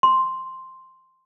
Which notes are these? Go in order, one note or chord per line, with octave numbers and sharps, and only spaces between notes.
C6